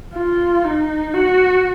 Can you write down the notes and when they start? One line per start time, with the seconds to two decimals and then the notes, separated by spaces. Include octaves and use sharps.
0.14 F4
0.64 D#4
1.14 F#4